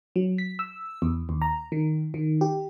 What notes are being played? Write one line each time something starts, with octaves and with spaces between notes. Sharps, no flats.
F#3
B6
E6
E2
D#2
A#5
D#3
D#3
G4